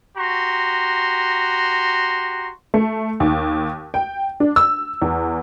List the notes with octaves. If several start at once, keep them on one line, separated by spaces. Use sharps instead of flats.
F#4 G4 A#5 C6
A3
D#2
G5
D4
E6
E2